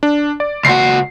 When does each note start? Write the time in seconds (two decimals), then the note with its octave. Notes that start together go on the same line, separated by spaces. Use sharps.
0.03 D4
0.40 D5
0.65 C#2 F#4 C7